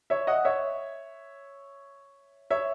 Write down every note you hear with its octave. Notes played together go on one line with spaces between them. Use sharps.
C#5 E5
D#5 F#5
C#5 E5
C#5 E5